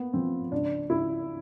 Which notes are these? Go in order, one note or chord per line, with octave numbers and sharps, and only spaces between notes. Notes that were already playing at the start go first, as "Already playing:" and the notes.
Already playing: A#3 B3
F3 C4
C#2 D4
C#2 E4